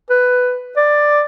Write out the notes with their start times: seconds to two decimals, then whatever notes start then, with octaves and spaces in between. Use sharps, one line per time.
0.10 B4
0.77 D5